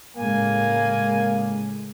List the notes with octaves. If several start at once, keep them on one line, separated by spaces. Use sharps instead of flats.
A2 C#3 G#3 A#3 G#5